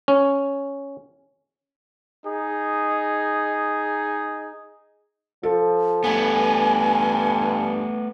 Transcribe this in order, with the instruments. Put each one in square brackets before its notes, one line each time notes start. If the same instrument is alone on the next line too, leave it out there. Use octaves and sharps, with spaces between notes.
[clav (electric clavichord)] C#4
[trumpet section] D#4 G#4
[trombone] F3 [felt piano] A4
[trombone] G2 [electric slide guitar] A3 B3 [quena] G#5